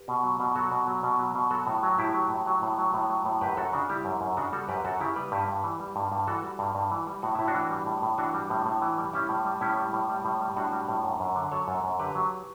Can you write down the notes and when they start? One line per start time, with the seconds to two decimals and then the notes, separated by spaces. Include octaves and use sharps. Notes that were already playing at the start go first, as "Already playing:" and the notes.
Already playing: G4 B4
0.08 B2
0.24 F#3
0.40 B2
0.55 F#3 F#4 A4
0.71 B2
0.87 F#3
1.03 B2
1.19 F#3
1.35 B2
1.51 F#3 F#4 A4
1.67 A2
1.83 F#3
1.98 A2 E4 G4
2.14 F#3
2.30 A2
2.46 F#3
2.62 A2
2.78 F#3
2.94 A2
3.10 F#3
3.25 A2
3.41 F#2 G4 B4
3.57 F#2 F#4 A4
3.73 C#3 D4 F#4
3.89 G3 E4 G4
4.05 F#2
4.21 F#2
4.37 C#3 D4 F#4
4.52 G3 F#4 A4
4.69 F#2 G4 B4
4.85 F#2 F#4 A4
5.00 C#3 E4 G4
5.16 G3 G4 B4
5.32 G2
5.48 G2
5.64 E3
5.80 G3
5.96 G2
6.12 G2
6.27 E3 F#4 A4
6.43 G3
6.59 G2
6.75 G2
6.91 E3
7.07 G3
7.22 A2 F#4
7.35 A2 E4
7.48 D4 F#4
7.55 E3
7.70 G3
7.86 A2
8.02 A2
8.18 E3 D4 F#4
8.34 G3
8.50 A2
8.66 A2
8.82 E3
8.98 G3
9.13 G3 C#4 E4
9.29 A2
9.45 G3
9.61 A2 C#4 E4
9.77 G3
9.93 A2
10.09 G3
10.25 A2
10.41 G3
10.56 A2 D4 F#4
10.72 G3
10.88 A2
11.04 F#2
11.20 F#2
11.36 D3
11.51 F#3 A4 C#5
11.68 F#2
11.84 F#2
11.99 D3 G4 B4
12.15 F#3